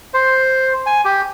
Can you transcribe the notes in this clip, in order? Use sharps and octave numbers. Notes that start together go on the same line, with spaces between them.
C5
G#5
G4